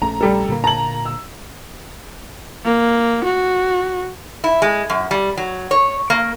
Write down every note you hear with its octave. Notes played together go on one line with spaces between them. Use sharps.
A#1 A3 C#4 A#5
G3 A4
A#2 D3 A#3
A5 A#5 F#7
E6
A#3
F#4
E4
G#3
F#2
G3
F#3
C#5
A#3